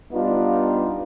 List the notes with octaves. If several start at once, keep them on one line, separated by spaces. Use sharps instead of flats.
G3 B3 D4 D#4 F4